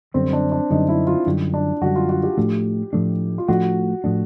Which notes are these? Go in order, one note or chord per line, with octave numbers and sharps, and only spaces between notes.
F#2 D3 G3 C4
D4
D4
F#2 D3 G3 D#4
E4
F4
F#2 D3 G3
D4
F#2 D3 G3 F#4
F4
F#4
G4
A2 F3 A3 D4
A2 F3 A3 D4
F4
A2 F3 A3 D4 F#4
A2 F3 A3 D4